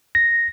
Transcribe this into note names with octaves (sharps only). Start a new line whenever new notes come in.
A#6